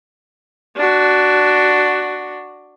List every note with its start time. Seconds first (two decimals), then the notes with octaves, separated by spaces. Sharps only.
0.76 D4 F#4